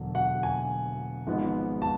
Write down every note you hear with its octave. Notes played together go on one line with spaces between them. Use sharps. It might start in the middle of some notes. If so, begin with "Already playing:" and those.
Already playing: E1 D3 F#3
F#5
G#5
G#1 G#2 F3 G#3 B3
A5